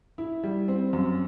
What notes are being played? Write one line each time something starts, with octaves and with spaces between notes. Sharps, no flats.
E4
G3
C4
F#2